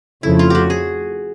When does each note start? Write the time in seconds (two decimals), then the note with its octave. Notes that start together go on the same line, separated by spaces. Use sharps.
0.23 F2 C#3 F3 A3 E4
0.39 F4
0.50 F#4 G4
0.70 G#4